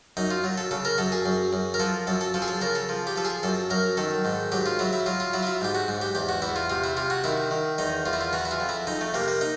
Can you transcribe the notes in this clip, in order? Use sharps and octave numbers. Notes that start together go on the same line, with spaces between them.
F#2 D#4
F4
F#3
A4
C#3 A4
A#4
F#2 A4
G#4
F#2
F#2
A#4
F3 A4
F#2 A4
A4
F3 A4
G#4
A4
C#3 A#4
A4
F3
G4
F3 A4
G#4
F#2 A4
F#2 A#4
D#3 A4
G#2
F#3 G4
F4
F#3 E4
E4
F#3 F4
F4
F#3 E4
F4
E4
G#2 G4
F#4
G#2
G4
E2 G4
F#4
E2 E4
F4
C3 F4
E4
C3 F4
F#4
D#3 E4
D#3
E2 D#4
E2 F4
E4
F4
E3 F#4
E4
F4
F2
E4
F2 D#4
A3
C3 A#3
A#3
D#4